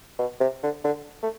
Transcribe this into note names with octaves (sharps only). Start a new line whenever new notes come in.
B2
C3
D3
D3
A3